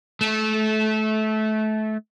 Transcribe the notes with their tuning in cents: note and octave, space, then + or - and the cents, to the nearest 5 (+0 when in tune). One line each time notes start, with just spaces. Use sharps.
A3 -25